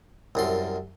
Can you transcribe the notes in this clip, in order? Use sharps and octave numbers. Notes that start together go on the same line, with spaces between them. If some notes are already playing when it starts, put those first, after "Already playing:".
C2 F#2 C6